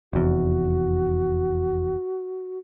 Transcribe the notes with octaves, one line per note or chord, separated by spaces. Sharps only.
F1 E2 F#4